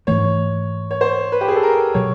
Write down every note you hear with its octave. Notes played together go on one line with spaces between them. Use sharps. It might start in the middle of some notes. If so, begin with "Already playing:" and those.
G#2 E3 A3 C#5
C#5
C5
B4
G4
G#4
A4
A#4
B2 F#3 C#5